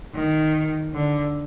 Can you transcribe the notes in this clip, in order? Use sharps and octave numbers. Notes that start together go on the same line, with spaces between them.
D#3
D3